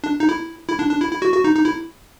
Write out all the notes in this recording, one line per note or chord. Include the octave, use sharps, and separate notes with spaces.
D4
D#4
E4
E4
D4
D4
E4
E4
F#4
F#4
D#4
D#4
E4